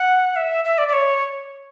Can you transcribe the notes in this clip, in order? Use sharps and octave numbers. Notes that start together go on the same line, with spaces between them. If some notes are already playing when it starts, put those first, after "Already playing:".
Already playing: F#5
E5
E5
D5
D5
C#5